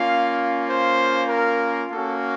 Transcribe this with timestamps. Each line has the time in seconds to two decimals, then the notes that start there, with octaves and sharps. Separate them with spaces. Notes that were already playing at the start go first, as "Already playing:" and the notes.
Already playing: A#3 C#4 F4 F5
0.69 C5
1.30 A#4
1.91 A#3 C#4 F#4 A4